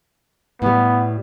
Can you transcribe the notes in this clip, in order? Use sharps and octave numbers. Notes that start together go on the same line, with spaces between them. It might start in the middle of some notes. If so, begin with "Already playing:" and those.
A2 G3 B3